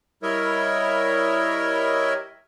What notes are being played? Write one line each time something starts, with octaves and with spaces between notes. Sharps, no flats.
G3 E4 A#4 C#5 D#5 E5